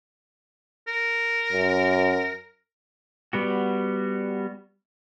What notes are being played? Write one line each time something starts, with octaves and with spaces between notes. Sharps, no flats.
A#4
F#2
G3 B3 F#4